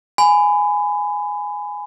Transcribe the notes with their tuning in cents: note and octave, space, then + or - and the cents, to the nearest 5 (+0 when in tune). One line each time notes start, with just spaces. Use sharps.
G#5 +0 B5 +25